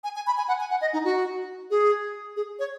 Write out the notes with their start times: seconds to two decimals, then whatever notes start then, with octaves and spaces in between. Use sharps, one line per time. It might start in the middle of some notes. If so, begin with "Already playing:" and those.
0.04 G#5
0.16 G#5
0.27 B5
0.37 G#5
0.48 F#5
0.60 G#5
0.71 F#5
0.81 D#5
0.93 D#4
1.05 F#4
1.71 G#4
2.36 G#4
2.59 C#5